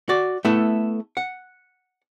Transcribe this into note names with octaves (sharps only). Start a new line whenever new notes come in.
F#4 D5
A3 B3 E4 A4
F#5